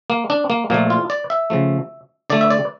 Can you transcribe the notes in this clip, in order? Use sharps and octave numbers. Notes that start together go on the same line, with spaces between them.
A#3
D4
A#3
A#2 F3 A3 A#3
F4
D5
E5
C#3 F3 A3
D3 A3 D5
E5
D5